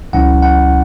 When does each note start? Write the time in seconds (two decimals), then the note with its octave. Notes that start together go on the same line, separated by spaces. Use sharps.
0.13 C#2 B2 F#3 C#4 E4 F#5
0.42 F#5